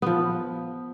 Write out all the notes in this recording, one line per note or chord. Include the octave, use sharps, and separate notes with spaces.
F3 B3